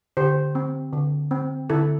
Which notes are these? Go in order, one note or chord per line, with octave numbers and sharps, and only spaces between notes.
D3 G4 C5
C4
D3
C4
D3 E4 A4